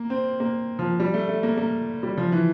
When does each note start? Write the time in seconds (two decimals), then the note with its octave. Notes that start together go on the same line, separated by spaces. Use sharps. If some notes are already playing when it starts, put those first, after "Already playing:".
Already playing: A#3
0.10 C4
0.40 A#3
0.79 F3
1.00 G3
1.14 A3
1.29 A3
1.43 A#3
1.58 A#3
2.03 G3
2.17 F3
2.32 E3